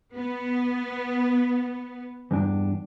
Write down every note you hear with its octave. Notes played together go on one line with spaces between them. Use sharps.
B3
E2 G2 D4